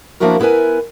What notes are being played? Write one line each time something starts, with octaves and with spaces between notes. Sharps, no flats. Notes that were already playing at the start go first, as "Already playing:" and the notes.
F3 A#3 D4 E4 F#4 A#4
B3 E4 G4 A#4 B4 G#5